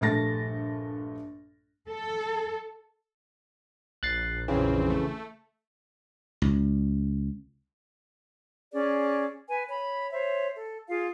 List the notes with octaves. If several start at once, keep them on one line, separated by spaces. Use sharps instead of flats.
A#1 G2 A3 A4 A6 A#6
A4
A#1 F#6 A6 C7
A#1 F2 C#3 E3 C4
A3
C#2
C#4 G#4 D5
B4 G#5
C#5 B5
C5 C#5 E5
A4
F4 G#4 F5